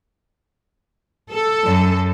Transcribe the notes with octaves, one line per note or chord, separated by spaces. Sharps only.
A4
F#2